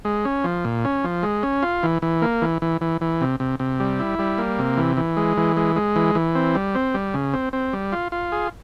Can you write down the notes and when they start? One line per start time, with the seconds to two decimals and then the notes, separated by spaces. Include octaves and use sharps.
0.05 G#3
0.25 C#4
0.44 F3
0.65 A#2
0.85 C#4
1.04 F3
1.23 G#3
1.43 C#4
1.63 F4
1.83 E3
2.02 E3
2.22 A#3
2.42 E3
2.62 E3
2.81 E3
3.01 E3
3.21 C3
3.40 C3
3.60 C3
3.80 G3
4.00 E4
4.19 G3
4.38 A#3
4.59 C3
4.77 E3
4.97 E3
5.17 G#3
5.37 E3
5.57 G#3
5.76 G#3
5.96 E3
6.15 E3
6.35 C4
6.55 G3
6.75 C4
6.94 G3
7.14 C#3
7.34 C4
7.53 C4
7.73 G3
7.92 F4
8.12 F4
8.32 G#4